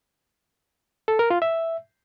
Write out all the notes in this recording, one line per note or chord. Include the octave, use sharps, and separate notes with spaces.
A4
A#4
F4
E5